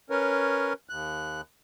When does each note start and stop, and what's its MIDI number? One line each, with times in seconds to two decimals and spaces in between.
0.10 0.73 61
0.10 0.73 70
0.10 0.73 71
0.10 0.73 73
0.89 1.41 39
0.89 1.41 90